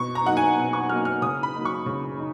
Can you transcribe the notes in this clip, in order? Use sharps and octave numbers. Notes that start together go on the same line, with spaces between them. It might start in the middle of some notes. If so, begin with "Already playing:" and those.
Already playing: B2 C#6
A#5
F#3 A#3 D#4 F#5
G#5
B2
C#6
F#3 A#3 D#4 F6
F6
C#3 D#6
B5
F#3 A#3 D#4
C#6
C#3
D#4